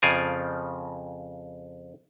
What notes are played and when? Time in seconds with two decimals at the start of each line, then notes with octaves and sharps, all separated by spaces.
0.02 F2 C#3 F3 D5 F5 G#5